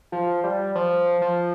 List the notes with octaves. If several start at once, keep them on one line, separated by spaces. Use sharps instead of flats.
F3
G3
F3
F3